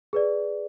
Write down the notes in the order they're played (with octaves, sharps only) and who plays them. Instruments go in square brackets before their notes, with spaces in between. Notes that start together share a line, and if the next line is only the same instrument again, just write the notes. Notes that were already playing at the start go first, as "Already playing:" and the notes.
[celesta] G#4 B4 D5